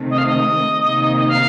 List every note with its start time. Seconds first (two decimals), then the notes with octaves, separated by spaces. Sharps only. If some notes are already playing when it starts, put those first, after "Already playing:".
Already playing: C3 D#3 A3 C4
0.10 D#5
0.18 F5
0.26 D#5
0.78 C3 D#3 A#3 D#4
1.16 D#5
1.28 F5